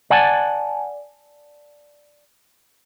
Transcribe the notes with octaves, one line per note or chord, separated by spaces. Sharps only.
D5 F#5 G#5 A5